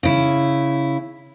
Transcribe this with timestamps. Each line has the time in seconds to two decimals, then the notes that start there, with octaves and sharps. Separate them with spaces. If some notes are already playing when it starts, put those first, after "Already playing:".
0.03 C#3 E4